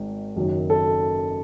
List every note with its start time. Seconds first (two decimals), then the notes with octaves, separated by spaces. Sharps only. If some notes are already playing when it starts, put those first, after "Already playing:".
Already playing: G#1 G#2 D#3
0.36 F#1 F#2 D#3 F#3
0.70 A4